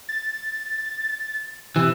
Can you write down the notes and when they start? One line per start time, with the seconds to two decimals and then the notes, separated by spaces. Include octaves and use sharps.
0.09 A6
1.76 C3 E3